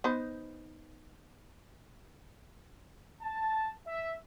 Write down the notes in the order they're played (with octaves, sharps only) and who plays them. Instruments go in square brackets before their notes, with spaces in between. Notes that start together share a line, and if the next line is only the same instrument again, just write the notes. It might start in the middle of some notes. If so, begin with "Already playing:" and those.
[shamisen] B3 D#4 C5
[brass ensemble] A5
E5